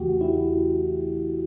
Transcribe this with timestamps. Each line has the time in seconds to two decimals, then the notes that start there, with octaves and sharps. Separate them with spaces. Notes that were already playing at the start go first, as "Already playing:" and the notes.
Already playing: E2 C#3 E3 A3 F#4 G4
0.21 E4